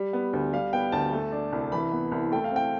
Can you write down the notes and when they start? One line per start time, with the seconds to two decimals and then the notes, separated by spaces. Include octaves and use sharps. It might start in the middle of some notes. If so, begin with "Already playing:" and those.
Already playing: G3
0.13 B3
0.33 D2
0.53 G3 F5
0.73 B3 G5
0.92 D2 A5
1.13 A3
1.32 D4
1.52 C2
1.72 E3 B5
1.92 B3
2.12 C2
2.32 A3 G5
2.44 F5
2.52 C4 G5